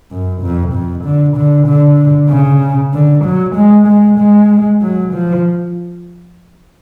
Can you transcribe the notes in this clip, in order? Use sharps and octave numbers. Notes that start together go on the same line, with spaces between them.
F#2
F2
F2
D3
D3
D3
C#3
D3
F#3
G#3
G#3
G#3
F#3
F3